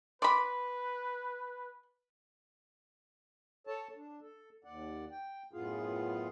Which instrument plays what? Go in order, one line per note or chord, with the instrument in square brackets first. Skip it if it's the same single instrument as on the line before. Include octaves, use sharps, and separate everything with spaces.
[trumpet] B4 [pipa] D5 B5 [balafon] C6 D6
[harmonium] A4 C#5 A5
D4
A4
D#2 D5 F#5
G5
F#2 A2 B3 F4 G#4 F5